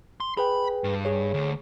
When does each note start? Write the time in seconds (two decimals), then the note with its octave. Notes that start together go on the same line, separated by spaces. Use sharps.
0.20 C6
0.37 G#4 B4 G5 B5
0.84 G2
1.05 G#4 C#5
1.34 D2